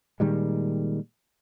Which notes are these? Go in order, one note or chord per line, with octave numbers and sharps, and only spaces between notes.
A#2 D#3 G3 G#3